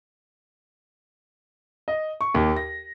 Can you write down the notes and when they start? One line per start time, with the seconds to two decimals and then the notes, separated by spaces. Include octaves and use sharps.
1.88 D#5
2.21 C#6
2.35 D#2
2.56 A#6